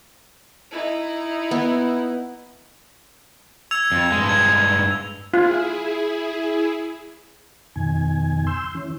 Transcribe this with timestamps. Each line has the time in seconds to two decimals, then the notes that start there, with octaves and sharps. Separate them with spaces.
0.72 D#4 E4
1.51 B3
3.71 E6 G#6 F7
3.92 F2
4.12 G2 G#3
4.29 G#6
5.34 E4 F4 G#4
7.76 F2 B2 D#3 G#5
8.47 C6 E6 G6
8.75 E3 C#4